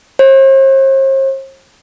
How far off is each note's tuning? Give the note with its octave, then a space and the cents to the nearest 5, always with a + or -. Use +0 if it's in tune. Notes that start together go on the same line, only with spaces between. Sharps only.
C5 +45